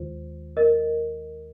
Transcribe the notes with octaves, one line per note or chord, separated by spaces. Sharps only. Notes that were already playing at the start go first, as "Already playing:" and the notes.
Already playing: D#2 D#3 G#3 F4 C5
A#4 D#5